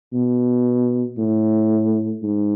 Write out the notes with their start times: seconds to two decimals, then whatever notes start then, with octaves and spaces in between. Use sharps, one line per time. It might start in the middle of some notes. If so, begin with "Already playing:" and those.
0.13 B2
1.18 A2
2.23 G#2